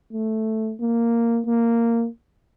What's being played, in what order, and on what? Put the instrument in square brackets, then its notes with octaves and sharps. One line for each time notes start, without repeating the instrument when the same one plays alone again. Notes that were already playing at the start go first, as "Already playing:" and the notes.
[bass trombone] A3
A#3
A#3